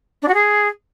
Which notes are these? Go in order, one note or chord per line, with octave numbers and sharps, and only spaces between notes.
D4
F#4
G#4